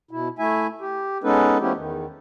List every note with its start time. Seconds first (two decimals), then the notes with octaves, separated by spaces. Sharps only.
0.11 B2 E4
0.39 A3 E4 E5 G#5
0.81 G4
1.24 G#3 B3 C#4 D#4 A4 B4
1.61 F3 A3 B3 C#4 E4 G4
1.76 E2 D#3